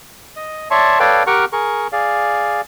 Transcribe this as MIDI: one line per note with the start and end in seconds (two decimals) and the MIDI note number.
0.36 0.68 75
0.71 0.99 73
0.71 0.99 74
0.71 0.99 76
0.71 0.99 81
0.71 0.99 84
0.71 0.99 85
1.00 1.23 69
1.00 1.23 71
1.00 1.23 73
1.00 1.23 74
1.00 1.23 77
1.00 1.23 79
1.27 1.45 67
1.27 1.45 70
1.27 1.45 78
1.27 1.45 79
1.27 1.45 85
1.27 1.45 89
1.53 1.87 68
1.53 1.87 70
1.53 1.87 85
1.93 2.61 68
1.93 2.61 74
1.93 2.61 77